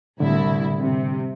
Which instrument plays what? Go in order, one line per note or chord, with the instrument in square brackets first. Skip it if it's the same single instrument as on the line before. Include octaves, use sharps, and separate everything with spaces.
[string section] C2 E4 [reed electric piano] A2 D3
[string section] C3